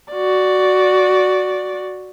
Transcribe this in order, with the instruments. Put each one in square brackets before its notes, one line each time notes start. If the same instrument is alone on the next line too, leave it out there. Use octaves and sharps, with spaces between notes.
[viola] F#4 D5